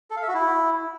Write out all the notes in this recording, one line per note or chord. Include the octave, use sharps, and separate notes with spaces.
A4
F5
E5
F#4
E4